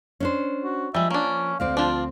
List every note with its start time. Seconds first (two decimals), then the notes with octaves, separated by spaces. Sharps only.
0.20 C#4 D4 C5
0.64 F#4
0.94 F3 G3 G#3 E5
1.10 A#3 C#4 D4
1.60 D2 C4 D5 F5
1.77 F3 D4 F4